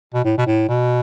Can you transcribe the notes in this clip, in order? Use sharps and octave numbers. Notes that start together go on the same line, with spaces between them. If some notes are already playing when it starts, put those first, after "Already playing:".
B2
A2
B2
A2
B2